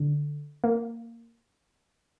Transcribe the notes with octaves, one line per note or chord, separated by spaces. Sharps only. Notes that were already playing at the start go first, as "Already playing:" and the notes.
Already playing: D3
A#3